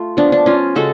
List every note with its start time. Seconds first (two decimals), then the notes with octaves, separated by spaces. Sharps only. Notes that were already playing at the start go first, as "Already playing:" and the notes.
Already playing: A3 F4
0.17 F3 B3 D4
0.32 D4
0.46 C#4 F4
0.75 C#3 G#3 F#4 A4